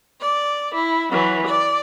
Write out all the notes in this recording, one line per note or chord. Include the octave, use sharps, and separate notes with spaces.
D5
E4
E3 F#3
D5